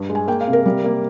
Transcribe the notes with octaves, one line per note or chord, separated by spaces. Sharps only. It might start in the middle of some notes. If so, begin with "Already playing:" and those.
Already playing: G2
G#3
G#5
A#3 G5
F5
C3
A#4
G3
A#3